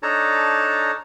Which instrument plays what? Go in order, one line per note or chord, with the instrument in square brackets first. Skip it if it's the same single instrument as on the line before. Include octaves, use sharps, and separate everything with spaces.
[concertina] D4 D#4 A4 C#5 A5 A#5